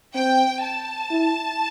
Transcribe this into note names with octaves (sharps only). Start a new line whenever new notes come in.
C4 G5
A5
E4